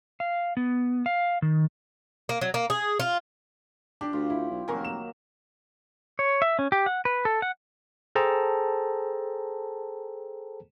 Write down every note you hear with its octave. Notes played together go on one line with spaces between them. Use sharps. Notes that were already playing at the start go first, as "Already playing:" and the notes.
F5
B3
F5
D#3
A#3
F#3
A#3
G#4
F4
D4 G4
D2 F4
E4
B1
F1 D#3 F#3 A#3 A#4 G#5
E7
C#5
E5
C#4
G4
F#5
B4
A4
F#5
G#4 A4 C5 G5 A5 A#5